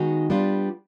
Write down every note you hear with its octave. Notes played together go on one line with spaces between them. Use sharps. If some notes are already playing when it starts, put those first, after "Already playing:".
Already playing: D#3 G#3 B3 D#4 F#4
G3 B3 D4 F4